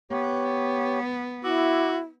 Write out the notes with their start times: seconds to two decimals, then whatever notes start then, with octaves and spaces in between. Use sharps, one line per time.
0.11 B3 G4 C#5
1.44 E4 F#4 D6 E6